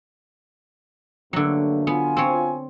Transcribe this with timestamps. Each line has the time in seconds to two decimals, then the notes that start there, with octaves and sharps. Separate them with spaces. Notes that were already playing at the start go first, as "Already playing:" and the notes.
1.33 G2 D3 F#3 A3 A#3
1.87 B3 F4 G#5
2.17 C4 C#5